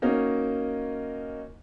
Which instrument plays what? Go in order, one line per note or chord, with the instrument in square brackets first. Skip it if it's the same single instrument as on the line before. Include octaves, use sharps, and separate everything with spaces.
[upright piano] A#3 C#4 D#4 F#4 A#4